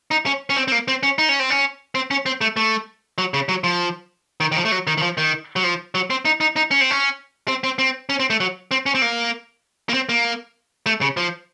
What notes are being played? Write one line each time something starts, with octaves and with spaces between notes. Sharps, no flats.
D#4
C#4
C#4
C4
C4
A#3
C4
C#4
D#4
C#4
C4
C#4
C4
C#4
C4
A3
A3
F#3
C#3
F#3
F3
D#3
D#3
F3
A3
F#3
D#3
D#3
F3
D#3
F#3
F3
F#3
C4
D#4
D#4
D#4
C#4
C4
C#4
C4
C4
C4
C#4
C4
A3
F#3
C4
C#4
C4
A#3
A#3
C4
A#3
A3
C#3
F3